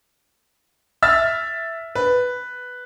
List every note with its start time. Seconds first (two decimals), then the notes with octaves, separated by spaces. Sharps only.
1.02 E5 E6 F6 A6
1.95 B4